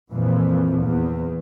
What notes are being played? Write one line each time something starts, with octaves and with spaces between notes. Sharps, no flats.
F2 A#2 E3 F3
E2